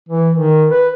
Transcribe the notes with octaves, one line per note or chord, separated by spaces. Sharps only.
E3
D#3
B4